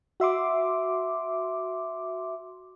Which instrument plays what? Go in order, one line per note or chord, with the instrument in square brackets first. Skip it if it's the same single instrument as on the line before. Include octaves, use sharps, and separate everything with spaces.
[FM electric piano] F#4 E5 C6 D6